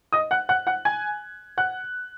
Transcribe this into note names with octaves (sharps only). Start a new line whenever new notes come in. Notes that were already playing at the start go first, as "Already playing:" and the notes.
D#5 D#6
F#5 F#6
F#5 F#6
F#5 F#6
G#5 G#6
F#5 F#6